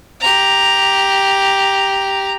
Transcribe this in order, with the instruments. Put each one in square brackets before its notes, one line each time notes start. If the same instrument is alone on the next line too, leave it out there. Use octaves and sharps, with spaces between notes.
[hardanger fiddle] G4 A#5